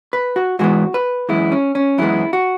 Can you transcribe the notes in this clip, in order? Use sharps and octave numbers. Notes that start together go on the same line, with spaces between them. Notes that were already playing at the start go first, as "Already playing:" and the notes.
B4
F#4
G#2 E3 G#3 B3 F#4
B4
F#2 E3 G#3 B3 E4
C#4
C#4
F#2 E3 G#3 B3 E4
F#4